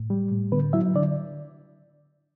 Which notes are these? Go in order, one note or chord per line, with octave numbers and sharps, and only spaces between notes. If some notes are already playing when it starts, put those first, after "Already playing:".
Already playing: A2
G3
A2
D3 B3 B4
F#3 E4 E5
D3 D4 D5